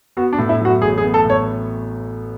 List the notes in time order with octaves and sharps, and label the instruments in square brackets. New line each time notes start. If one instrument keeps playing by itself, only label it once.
[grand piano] B3 [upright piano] F#4
[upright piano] D4
[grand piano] A2
[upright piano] E4
[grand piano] F#3 [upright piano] F#4
[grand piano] A1 [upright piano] G#4
[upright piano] G#4
[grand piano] B3
[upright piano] A4
[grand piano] A2
[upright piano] C#5